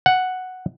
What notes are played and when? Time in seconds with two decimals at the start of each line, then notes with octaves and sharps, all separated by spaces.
0.06 F#5